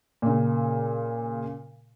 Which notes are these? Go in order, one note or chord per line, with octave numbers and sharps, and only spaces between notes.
A#2 C#3